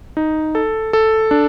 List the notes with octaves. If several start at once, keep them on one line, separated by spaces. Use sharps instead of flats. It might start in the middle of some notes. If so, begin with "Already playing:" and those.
D#4
A4
A4
D4